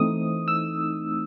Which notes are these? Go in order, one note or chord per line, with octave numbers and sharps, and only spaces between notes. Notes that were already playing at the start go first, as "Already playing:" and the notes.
Already playing: E3 A3 C4 D#4 D#6
E6